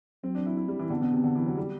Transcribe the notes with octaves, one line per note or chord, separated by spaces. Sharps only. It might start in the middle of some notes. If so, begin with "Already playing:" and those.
F#3 C4
D4
E4
E4
G3
E3
D3 B3
B2
C3
D3
E3
F#3
G3